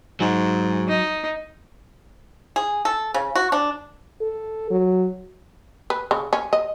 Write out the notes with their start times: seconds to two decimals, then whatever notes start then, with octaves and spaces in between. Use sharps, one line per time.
0.20 G#2 F#3
0.88 D#4
2.56 G#4
2.85 A4
3.14 C#3
3.35 F#4
3.52 D4
4.21 A4
4.71 F#3
5.90 B4
6.11 C#3
6.33 C#4
6.53 D#5